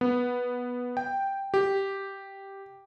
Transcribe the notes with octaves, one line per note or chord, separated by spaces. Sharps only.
B3
G5
G4